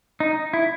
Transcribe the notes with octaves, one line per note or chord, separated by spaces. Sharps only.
D#4
E4